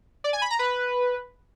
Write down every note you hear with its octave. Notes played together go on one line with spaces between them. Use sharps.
D5
G#5
B5
A#5
B4